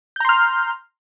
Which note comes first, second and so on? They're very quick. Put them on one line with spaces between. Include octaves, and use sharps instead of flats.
G6 A#5 C6 F6